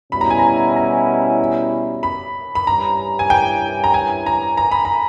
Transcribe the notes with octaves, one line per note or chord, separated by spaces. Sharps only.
B2 G3 C#4 E4 B5
A#5
G#5
A#5
A#5
B5
B5
G2 E3 G3 C#4 E4 A#5
G#5
G5
A#5
G#5
A#5
A#5
B5
A#5